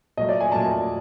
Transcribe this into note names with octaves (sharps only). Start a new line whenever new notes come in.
A#2 F#3 A3 D#5
D5
G#5
A#2 F#3 A3 A5